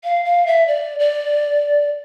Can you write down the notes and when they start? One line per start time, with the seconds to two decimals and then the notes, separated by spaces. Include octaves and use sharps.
0.04 F5
0.25 F5
0.47 E5
0.67 D5
0.99 D5